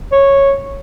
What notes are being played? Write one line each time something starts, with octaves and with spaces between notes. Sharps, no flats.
C#5